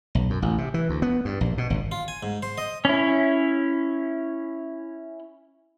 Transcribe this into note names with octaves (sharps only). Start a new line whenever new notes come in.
B1
F#2
A1
C3
E3
D2
B3
G2
A#1
B2
G#1
F4
G#5
G#2
C5
D#5
C#4 E4